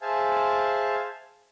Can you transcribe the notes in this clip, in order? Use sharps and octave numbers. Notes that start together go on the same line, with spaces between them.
G#4 C5 E5 F5 G#5 A5